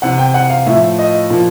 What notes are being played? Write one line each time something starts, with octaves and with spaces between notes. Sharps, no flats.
C3 E3 F#5
G5
F#5
F5
A2 F3 E5
D#5
A#2 F3